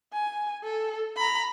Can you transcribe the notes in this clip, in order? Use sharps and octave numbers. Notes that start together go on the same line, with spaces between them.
G#5
A4
A#5 B5